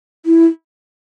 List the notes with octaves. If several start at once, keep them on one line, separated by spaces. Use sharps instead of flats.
E4